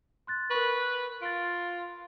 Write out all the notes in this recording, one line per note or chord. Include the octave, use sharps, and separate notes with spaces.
C6 F#6 A6
A#4 B4 C#6
F4 A6 D7